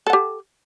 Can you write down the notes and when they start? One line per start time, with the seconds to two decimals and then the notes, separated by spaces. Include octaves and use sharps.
0.07 A4
0.10 F#5
0.13 G4